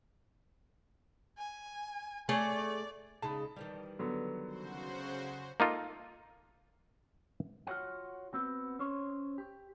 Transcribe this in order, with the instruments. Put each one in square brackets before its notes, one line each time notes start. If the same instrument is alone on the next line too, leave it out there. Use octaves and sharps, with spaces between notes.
[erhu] G#5
[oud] A3 G#4 C#5 [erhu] D5
[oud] C#3 G#3 D#4 [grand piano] A5 B5
[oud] D#3 E3 G3
[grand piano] D3 F#3 B3
[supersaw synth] C#3 F#4 C5
[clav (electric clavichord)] A#3 D#4 F4 A4
[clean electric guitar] F4 F#4 G#4 C#5 F#5
B3 C4 F#4
C#4 C5 C#5
G4